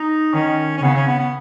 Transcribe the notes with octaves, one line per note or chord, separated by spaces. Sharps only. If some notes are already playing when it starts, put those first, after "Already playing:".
Already playing: D#4
D#3 C#4
C#4
C#3 B3
C#4
B3
B3